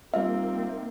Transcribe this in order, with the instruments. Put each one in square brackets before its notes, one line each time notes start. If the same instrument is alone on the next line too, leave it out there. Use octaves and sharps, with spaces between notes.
[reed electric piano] G3 F4 F5 [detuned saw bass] A#3 [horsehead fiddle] C4 D#4 [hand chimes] E5